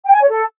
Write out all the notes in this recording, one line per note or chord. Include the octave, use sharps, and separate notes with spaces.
G5
G#5
C#5
A4